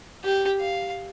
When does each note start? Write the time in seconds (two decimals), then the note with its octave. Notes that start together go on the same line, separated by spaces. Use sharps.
0.24 G4
0.60 F5